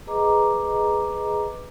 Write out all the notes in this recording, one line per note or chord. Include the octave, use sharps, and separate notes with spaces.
G#4 B4 D#5 A#5 D6